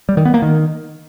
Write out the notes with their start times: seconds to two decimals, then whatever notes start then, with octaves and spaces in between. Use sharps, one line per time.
0.09 G3
0.17 D#3
0.25 B3
0.34 A#3
0.42 D#3